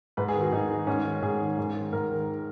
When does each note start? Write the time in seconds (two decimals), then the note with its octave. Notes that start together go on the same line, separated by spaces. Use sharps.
0.17 G#2 B4
0.28 G#4
0.35 D#3
0.41 F#4
0.52 G#2 D#4
0.70 D#3
0.87 G#2 C#4
1.05 D#3
1.22 G#2 G#4
1.40 D#3
1.58 G#2
1.75 D#3
1.93 G#2 A#4
2.10 D#3